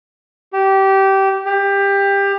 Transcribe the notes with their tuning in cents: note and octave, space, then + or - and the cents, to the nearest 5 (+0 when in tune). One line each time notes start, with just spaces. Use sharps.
G4 -20
G4 +20